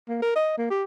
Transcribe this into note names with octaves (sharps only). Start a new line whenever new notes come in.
A#3
A#4
D#5
A#3
G4